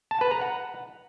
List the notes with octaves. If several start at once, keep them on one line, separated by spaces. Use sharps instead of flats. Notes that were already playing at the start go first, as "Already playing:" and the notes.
A5
B4
A#5
F#5